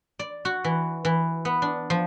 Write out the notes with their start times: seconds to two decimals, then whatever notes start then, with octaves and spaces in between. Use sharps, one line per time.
0.19 D5
0.45 F#4
0.64 E3
1.05 E3
1.45 B3
1.62 D4
1.90 F3